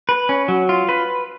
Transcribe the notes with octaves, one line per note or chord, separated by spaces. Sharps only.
B4
C#4
F#3
F4
B4